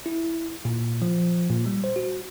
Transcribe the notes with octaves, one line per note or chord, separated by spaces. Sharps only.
E4
A#2
F3
A#2
G3
C5
F#4